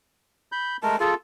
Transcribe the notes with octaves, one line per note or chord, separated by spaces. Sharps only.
B5 G6
G#3 A3 A#4 A5
F4 G#4 A4